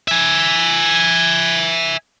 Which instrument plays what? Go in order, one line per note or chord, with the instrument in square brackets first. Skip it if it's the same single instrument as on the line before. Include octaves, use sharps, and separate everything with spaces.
[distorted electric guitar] E5 G#5